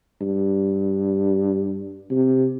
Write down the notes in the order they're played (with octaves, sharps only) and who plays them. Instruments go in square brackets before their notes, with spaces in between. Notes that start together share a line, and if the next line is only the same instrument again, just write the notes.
[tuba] G2
C3